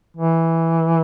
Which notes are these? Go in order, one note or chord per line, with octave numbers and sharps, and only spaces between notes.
E3